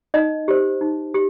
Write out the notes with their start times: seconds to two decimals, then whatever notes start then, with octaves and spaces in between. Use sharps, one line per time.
0.14 D#4 D#5
0.48 G4 C5
0.81 D#4
1.14 G4